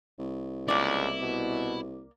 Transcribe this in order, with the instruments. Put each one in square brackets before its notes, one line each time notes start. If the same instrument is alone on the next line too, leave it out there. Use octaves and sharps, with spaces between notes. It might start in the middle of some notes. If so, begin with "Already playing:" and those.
[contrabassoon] C2
[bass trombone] C#2 [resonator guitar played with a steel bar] A#3 D5 [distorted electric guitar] E4
[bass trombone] B2